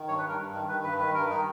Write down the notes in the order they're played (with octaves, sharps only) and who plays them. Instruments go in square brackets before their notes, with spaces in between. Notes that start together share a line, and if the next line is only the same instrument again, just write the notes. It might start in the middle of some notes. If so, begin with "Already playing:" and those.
Already playing: [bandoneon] D#3
G2 C#5
B4
G2
A#4
G2
D#3
D#3 B4
G2 B4
D#3 B4
G2 A#4
D#3 D#4